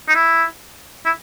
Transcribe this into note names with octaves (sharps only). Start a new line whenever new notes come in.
D#4
E4
E4